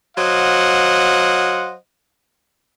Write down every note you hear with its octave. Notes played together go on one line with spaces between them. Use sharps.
F#3 C5 D#5 F5 F#5